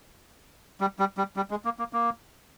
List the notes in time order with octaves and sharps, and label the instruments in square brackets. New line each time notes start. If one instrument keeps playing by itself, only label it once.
[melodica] G3
G3
G3
G3
G#3
A#3
A#3
A#3